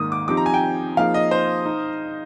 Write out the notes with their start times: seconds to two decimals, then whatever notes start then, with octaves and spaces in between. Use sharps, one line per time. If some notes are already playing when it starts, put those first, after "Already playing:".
Already playing: G#2 D#3 A#3 D#6
0.12 D6
0.28 F3 C4 D#4 G4 D6
0.37 A#5
0.46 G#5
0.54 G5
0.97 F3 A#3 D#4 G#4 F5
1.14 D#5
1.31 C5
1.66 D#4